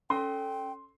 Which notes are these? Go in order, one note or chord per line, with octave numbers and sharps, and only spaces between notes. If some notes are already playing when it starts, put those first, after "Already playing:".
C#4 A4 G5 C6